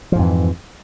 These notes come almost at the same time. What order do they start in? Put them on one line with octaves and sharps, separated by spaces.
F3 G#2 F2 E3